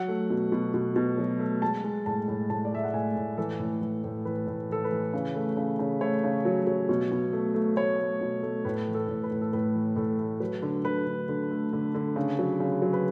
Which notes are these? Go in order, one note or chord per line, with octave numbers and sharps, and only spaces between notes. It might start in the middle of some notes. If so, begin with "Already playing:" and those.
Already playing: F#3 F#5
A3
B2
B2
B2
B2
F#3
A3
G#3 A5
G#3
A2 A5
A2
A2 A5
D5
G#3 E5
F#5
A2 G#5
A2
E3 A4
A2
E3
A2
E3 B4
A2
E3 A4
B4
E3
C#3
A3
C#3
C#3
A3 C#5
C#3
F#3
F#3
B2
B2
A3
A3
A3 C#5
A3
B2
A3
A2 B4
E3
A4
A2
B4
A2
A4
A2 B4
E3
A2 A4
A3
F#3 B4
D3
D3 B4
D3
D3
A3
D3
D3
C#3
F#3
C#3
F#3
B4